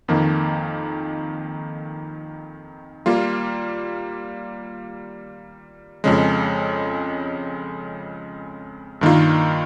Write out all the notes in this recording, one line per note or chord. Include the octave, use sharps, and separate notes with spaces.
F2 D#3 A#3
G3 A#3 F4
F2 C#3 G#3
G2 D#3 A#3 F4